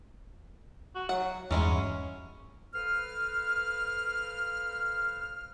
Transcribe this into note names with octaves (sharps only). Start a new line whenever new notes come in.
F#4
F#3 F#5
E2 G2 F#3 G#3 C#4 E4
A4 B4 C5 F5 F6